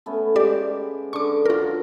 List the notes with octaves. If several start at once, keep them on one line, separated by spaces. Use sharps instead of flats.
A3 B3 C#4
G#3 G4 D5
D3 C#6 D6
F#3 F4 A#4 A5